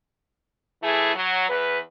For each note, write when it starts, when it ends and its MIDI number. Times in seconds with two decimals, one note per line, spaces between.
0.82 1.13 52
0.82 1.13 57
0.82 1.13 64
0.82 1.13 68
1.15 1.48 54
1.48 1.78 40
1.48 1.78 71